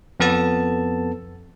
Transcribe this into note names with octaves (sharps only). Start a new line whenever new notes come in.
F2 B3 A4 A5